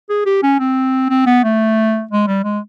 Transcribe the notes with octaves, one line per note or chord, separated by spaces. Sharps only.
G#4
G4
C#4
C4
C4
B3
A3
G#3
G3
G#3